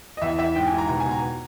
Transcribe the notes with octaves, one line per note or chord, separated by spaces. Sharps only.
D#5
E2 E5
E2 E5
G#2 G5
G#5
G#2
A#5
B2 A#5
G#5
B2
A#5